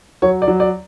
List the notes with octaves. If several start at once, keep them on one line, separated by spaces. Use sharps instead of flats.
F#3 C#5
D5
F#3
D5